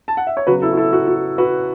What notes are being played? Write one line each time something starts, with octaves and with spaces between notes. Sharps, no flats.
A5
F#5
E5
C#5
C#3 F#3 B3 F#4 B4
E4 A4
F#4
E4 A4
F#4
F#4
F#4 B4